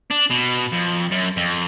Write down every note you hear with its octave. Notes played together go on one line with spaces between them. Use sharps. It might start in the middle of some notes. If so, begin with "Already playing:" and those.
D4
B2
F2
F#2
F2